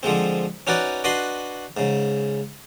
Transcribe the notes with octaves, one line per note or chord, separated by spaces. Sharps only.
D3 F3 G#3 C4
C#4 D#4 F#4 B4 D5
D4 F#4 B4 D#5 B5 C6
G#2 C#3